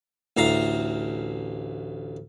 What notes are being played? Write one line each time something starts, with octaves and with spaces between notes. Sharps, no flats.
A1 D2 F5 A#5